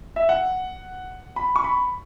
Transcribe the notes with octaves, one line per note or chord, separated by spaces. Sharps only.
E5
F#5
B5
C#6
B5